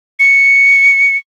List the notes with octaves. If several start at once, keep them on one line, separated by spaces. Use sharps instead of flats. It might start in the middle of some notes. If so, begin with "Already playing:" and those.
C#7